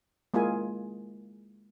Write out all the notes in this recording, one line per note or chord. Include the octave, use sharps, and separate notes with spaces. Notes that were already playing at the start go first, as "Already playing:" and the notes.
G#3 A#3 E4 F4 G#4 G#5